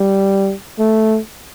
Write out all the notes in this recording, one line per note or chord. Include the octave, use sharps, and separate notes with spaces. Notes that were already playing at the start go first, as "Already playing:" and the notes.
Already playing: G3
A3